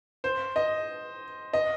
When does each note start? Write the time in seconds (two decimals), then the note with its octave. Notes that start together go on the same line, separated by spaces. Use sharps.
0.24 C5
0.56 D#5
1.53 D#5